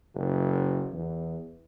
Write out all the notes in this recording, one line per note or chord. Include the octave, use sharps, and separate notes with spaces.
F#1
E2